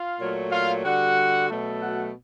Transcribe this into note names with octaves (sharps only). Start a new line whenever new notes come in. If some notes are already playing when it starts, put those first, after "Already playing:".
Already playing: F4 F5
A#2 F#3 A3
F4 F5
D3 G3 F#4 F#5
B2 F#3 A3
F#4 F#5